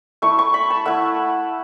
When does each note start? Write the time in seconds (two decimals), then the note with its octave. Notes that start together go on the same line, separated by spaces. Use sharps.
0.22 A3 E4 C#6
0.39 C#6
0.54 B5
0.70 A5
0.85 A3 E4 F#5